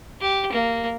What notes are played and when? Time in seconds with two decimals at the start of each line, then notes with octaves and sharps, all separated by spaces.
0.21 G4
0.52 A#3